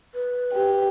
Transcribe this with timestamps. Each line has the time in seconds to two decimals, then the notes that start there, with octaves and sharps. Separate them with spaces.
0.15 B4
0.54 G4